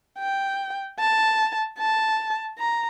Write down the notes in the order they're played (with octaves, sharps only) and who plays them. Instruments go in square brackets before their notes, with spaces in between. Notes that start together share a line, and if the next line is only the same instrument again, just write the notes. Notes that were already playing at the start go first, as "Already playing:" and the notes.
[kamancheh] G5
A5
A5
A#5